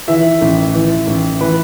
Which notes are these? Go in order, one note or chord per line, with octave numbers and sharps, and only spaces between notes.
E3 E5
A1
E3
A1
E3 B4